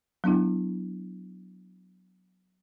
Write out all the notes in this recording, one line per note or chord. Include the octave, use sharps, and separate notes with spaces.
F#3 B3 D4 E4